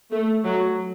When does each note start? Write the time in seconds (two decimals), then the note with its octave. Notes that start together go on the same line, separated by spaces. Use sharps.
0.12 A3
0.45 F#3